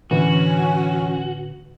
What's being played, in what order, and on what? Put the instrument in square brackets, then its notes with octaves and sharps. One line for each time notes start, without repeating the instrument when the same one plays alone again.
[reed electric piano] A2 D3 B4 [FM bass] E3 [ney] C#4 [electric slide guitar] F#4